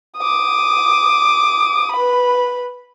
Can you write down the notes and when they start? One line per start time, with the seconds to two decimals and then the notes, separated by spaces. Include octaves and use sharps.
0.18 D6 D#6
1.92 B4 B5